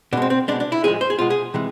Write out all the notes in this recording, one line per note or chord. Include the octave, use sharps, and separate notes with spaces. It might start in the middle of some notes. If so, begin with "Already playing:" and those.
B2 G#3 C4 D4
C4
B2 G#3 D4
D4
E4
A2 F3 G#3 G#4
C5
G#4
B2 G#3 F4
G#4
C3 E3 G#3